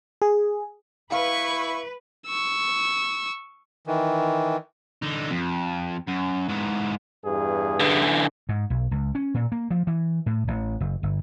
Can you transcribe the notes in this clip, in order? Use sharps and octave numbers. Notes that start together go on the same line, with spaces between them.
G#4
E4 B4 F5 C#6
C#6 E6
D#3 E3
D3 D#4
F2
F#2
G#2 E3
E2 G2 G#4
D3 E3
G#2
B1
C#2
C#4
A#2
A#3
F3
E3
A2
A1
F#1
G1